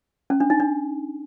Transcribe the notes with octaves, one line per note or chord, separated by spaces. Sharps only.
C#4
D4
D#4
D4